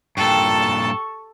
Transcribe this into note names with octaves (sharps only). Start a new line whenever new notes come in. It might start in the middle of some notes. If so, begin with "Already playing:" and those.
G2 A#2 G4 A4 A5 C#6